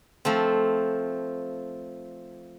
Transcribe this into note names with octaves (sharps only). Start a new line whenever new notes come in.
F3 A3 C4